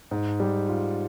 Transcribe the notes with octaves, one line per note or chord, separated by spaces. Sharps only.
G#2
G3
F4